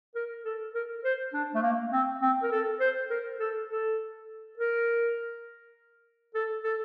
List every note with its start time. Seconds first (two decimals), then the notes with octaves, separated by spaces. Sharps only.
0.15 A#4
0.45 A4
0.74 A#4
1.04 C5
1.33 D4
1.55 A3
1.62 A#3
1.92 C4
2.22 C4
2.43 A#4
2.51 A4
2.80 C5
3.10 A#4
3.40 A4
3.70 A4
4.58 A#4
6.34 A4
6.64 A4